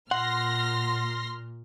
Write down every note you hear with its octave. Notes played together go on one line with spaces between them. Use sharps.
A#2 F#5 C6 F6 A#6